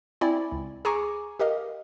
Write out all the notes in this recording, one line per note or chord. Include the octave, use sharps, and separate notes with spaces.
C4 E4 D5 G#5
C#2
G#4 G#5 A#5 C#6 D6
G4 A#4 D#5 F5